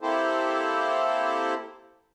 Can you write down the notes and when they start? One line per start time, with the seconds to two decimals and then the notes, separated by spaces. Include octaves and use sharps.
0.01 A#3 C4 E4 G4 A4 C5